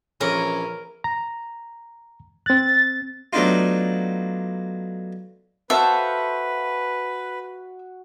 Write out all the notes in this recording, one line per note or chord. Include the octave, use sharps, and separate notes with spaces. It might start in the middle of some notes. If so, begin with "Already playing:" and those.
A#1 E3 F3 C#4 A#4
A#5
C4 F#6 A6
F#3 A3 B3 D4 D#4 F4
F#4 A4 B4 C5 E5 F5